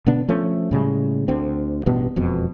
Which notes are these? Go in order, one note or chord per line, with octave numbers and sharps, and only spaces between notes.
B2 D3 B3 D4
F3 A3 C#4 D4
A2 C#3 G3 G#3
D2 D3 C4
A1 G2 B2 B3
E1 F2 B2